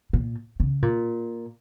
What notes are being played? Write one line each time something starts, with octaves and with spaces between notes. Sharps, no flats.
A#2
C#3
A#2